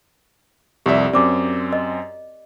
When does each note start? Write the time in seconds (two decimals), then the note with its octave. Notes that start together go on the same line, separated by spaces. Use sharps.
0.86 C2 F2 G4 D5 E5
1.13 F#2 C4 D5 D6
1.72 D#5